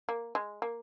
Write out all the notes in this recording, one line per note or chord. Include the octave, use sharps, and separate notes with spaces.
A#3
G#3
A#3